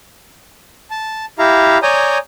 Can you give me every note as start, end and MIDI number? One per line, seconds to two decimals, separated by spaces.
0.91 1.25 81
1.39 1.78 64
1.39 1.78 67
1.39 1.78 76
1.39 1.78 77
1.39 1.78 82
1.83 2.18 73
1.83 2.18 74
1.83 2.18 80
1.83 2.18 82
1.83 2.18 87
1.83 2.18 91